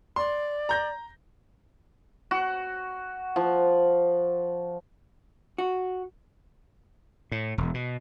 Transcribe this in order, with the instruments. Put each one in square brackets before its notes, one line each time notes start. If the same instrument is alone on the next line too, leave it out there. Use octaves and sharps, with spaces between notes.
[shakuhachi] D5 [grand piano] C6
[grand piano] A#5 G6 A#6
[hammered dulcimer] F#4
F3
[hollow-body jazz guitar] F#4
[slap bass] A2
E1
B2